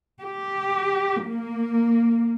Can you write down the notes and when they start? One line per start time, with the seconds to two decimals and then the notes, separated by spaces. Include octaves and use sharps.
0.22 G4
1.25 A#3